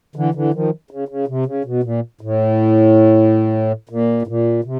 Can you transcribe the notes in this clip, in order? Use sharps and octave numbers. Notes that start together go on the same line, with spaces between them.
D3 E3
D3 E3
D#3 F3
C#3
C#3
C3
C#3
B2
A#2
A2
A#2
A2
A#2
C3